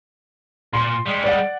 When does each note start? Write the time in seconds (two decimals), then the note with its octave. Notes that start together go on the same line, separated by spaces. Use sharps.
0.73 A#2 C6
1.06 G3 G#3
1.24 D5 F#5